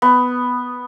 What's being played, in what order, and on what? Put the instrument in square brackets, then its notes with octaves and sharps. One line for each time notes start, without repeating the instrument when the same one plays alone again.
[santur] B3